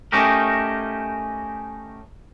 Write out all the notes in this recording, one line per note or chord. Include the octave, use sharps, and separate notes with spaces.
A3 C#4 D#4 G4 A#4